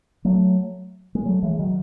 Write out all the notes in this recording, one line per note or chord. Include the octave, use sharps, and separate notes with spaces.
F#3 A3
G#3
F#3 A3
E3 G#3
D#3 F#3